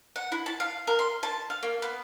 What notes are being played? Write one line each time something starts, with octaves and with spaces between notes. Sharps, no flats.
F#5
E4
A5
F5
A#4
C6
A5
F5
A#3
B3